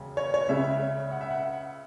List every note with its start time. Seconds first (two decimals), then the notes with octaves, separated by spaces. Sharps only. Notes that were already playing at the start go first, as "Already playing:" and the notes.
Already playing: E1 D#2 C#3
0.17 C#5
0.34 C#5
0.49 C#2 C#3 G#3 E5
1.11 F#5
1.21 E5
1.31 F#5